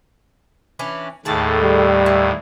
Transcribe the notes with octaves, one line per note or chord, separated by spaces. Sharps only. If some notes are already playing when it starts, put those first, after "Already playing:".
E3 C#4 D4
D#2 A2 G#4 A4 A5
G3
E4